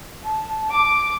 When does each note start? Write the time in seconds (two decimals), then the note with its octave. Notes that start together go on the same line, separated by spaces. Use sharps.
0.24 A5
0.75 D6